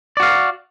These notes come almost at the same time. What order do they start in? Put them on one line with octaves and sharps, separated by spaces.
D5 F#4 F5